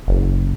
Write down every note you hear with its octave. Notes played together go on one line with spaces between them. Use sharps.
F#1